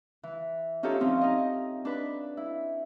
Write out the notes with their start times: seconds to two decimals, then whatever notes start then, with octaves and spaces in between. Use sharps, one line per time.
0.23 E3
0.83 C#4 D#4 F4 G4 A4 C#5
1.00 F3 C4 C#4 D#4
1.21 D#4 D#5
1.85 D4 B4 B5
2.37 E4